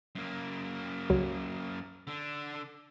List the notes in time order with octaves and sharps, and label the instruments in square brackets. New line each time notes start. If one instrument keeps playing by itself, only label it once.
[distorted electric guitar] F#2 A#3
[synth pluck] C#2 F#3
[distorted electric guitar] D3 D4